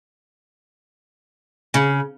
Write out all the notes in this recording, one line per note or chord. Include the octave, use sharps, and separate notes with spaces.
C#3